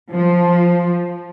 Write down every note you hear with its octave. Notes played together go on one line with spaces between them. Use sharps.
F3